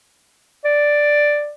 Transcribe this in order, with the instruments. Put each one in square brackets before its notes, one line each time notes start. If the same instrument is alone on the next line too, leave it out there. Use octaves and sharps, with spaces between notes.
[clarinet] D5